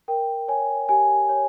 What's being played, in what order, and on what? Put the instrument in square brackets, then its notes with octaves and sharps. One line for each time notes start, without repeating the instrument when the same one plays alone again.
[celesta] A#4 G5
C#5 G#5
G4 G#5
C#5